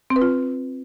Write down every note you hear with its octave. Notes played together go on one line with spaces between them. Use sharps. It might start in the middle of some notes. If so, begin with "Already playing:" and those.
C4
B4
F4